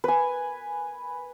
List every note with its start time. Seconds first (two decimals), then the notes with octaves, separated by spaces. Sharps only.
0.04 B4 G#5